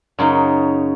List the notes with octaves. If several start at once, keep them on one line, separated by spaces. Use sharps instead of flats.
F#2 C#3 D#4